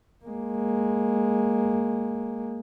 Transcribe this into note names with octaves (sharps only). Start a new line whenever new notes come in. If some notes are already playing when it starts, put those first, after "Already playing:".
G#3 A#3